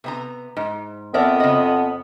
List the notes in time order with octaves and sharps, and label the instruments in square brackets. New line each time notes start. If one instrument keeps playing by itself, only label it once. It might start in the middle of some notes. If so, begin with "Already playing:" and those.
[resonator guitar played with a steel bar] C3 B3 A#5
G#2
[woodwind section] F2 B3 [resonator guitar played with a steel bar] A#4 D5 E5
[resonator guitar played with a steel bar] C#3 D#5